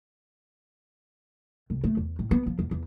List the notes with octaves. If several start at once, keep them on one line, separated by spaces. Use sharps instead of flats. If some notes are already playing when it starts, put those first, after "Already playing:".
C2
A3
E2
A2
B3
F3
E2
E2